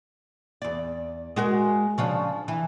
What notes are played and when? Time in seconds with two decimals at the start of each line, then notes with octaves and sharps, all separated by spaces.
0.62 E2 D5
1.36 G#3 F#4 A#4
1.98 C#3 F3 D4
2.48 E3